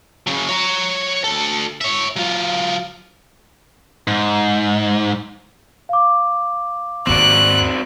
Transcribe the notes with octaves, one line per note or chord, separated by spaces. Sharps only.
C#3 F#3
C#5 A#5
D2 A4
C#5 E5
F#3 F4
G#2
F5 D6
D#2 G#2 C4 F#4 D5 F#6